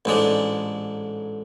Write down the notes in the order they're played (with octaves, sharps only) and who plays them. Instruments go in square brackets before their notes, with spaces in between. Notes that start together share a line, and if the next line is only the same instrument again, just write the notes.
[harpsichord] A1 G#2 G#3 D4